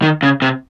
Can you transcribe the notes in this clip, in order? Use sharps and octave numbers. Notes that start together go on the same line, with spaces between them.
D#3
C#3
C3